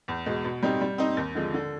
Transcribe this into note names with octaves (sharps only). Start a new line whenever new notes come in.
E2
B2 G#3
B2
G3 C4 D#4 G4
G3
C4 D#4
D#2
D3 F3 G#3
D3